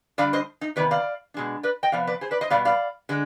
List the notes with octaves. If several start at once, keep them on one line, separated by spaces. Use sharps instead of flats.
D3 G3 D4 D5 F5
C5 D#5
D#4
C3 D#3 B3 B4 D5
D5 F5
B2 G#3 D4
B4 D5
D#5 G5
C3 F3 B3 D5 F5
B4 D5
G#4 C5
B4 D5
C5 D#5
B2 G3 B3 D5 F5
D5 F5
D3 G#3